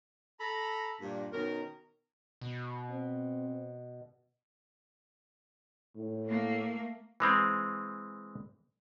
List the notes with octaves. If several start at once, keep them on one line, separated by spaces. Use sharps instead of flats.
A4 A#5 B5
G2 A#2
B2 D#3 C#4 A#4
B2
C4
A2
A3 A#3
E3 G#3 C4